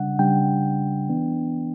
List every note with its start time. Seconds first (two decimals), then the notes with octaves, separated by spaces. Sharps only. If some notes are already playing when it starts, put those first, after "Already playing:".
Already playing: C#3 G3 D4 F#5
0.19 C#3 G3 D4 G5
1.09 E3 B3 D4